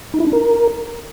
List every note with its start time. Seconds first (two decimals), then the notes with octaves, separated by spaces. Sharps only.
0.14 D#4
0.20 E4
0.26 D4
0.33 A#4